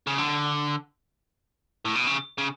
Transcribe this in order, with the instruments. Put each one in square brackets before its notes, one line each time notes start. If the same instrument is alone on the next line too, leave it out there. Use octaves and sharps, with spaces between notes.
[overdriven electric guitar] C#3
D3
A2
B2
C#3
C#3